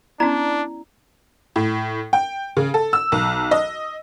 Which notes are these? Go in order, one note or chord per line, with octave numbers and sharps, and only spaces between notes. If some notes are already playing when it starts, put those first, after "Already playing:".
B3 C#4 D4 E4 D5 A#5
A2
G5
C#3
A4
E6
B1
D#5